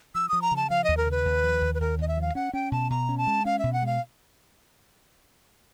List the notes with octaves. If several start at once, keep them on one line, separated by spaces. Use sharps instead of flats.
F3 E6
F3 D#6
A#5
C#3 A5
F3 F5
D#2 D#5
A#4
C#3 B4
D#2
F3
D#2
B4
D#2 A#4
D#2 D#5
E5
F3 F5
C#4 F#5
C#4 G5
B2 A5
B2 A#5
C#4
A5
G#3
C#4 F5
B2 E5
F#5
G#3 F5